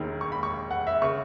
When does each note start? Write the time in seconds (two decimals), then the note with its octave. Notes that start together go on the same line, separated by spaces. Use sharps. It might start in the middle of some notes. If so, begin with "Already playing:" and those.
Already playing: E1 D#2 D#3
0.21 C#6
0.32 B5
0.43 C#6
0.71 F#5
0.87 E5
1.02 C#3 C#6